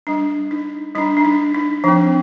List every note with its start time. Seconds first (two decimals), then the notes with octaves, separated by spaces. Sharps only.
0.07 G3 D4
0.51 D#4
0.95 G3 D4 D#4
1.17 D4
1.25 D#4
1.54 D#4
1.84 F3 C4 D4